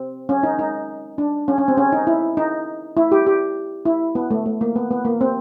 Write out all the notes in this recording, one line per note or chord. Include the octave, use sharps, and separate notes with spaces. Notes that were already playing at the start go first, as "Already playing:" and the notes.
Already playing: C4
C#4
D#4
D#4
D4
C#4
C#4
C4
C#4
D#4
E4
D#4
E4
G4
G4
E4
B3
A3
A3
A#3
B3
B3
A#3
C4